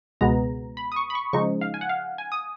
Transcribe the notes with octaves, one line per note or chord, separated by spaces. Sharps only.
C#2 B2 G#3 B3 A#5
B5
D#6
C#6
B5
C#6
C#3 F3 G#3 D#4 C#6
F5
G#5
F#5
F5
G#5
D#6